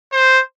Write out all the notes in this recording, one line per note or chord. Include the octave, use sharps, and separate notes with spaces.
C5